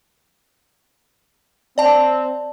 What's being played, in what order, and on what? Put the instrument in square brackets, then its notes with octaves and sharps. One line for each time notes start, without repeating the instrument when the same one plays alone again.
[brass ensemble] C4 [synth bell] D5 A5